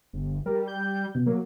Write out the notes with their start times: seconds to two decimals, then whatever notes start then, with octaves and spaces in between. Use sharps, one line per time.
0.13 G1
0.46 G3 A#4
0.68 G6
1.15 B2
1.26 F#3 A#3